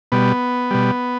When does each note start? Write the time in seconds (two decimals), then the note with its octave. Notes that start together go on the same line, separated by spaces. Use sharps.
0.12 B2 G3 B3
0.71 B2 G3